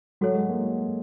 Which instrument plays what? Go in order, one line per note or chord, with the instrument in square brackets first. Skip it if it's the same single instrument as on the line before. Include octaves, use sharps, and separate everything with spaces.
[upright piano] F#3 [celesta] F#4 A4 C#5 F#5
[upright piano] G#3
A#3